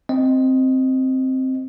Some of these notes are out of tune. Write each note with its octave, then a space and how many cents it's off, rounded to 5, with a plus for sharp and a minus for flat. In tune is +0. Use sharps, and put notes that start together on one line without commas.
C4 +0 D#5 +5